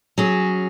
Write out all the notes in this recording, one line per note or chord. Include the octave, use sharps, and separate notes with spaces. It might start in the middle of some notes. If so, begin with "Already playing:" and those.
F#3 C#4 G#4